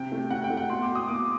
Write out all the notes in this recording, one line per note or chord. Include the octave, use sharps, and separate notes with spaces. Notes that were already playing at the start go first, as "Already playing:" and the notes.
Already playing: C3 G5
A3
C3 F#5
G5
A3
F#5
B2 C6
D6
B2
D#6
A#3 D6